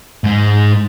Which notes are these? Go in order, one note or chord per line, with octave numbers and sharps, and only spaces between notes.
G#2 G#3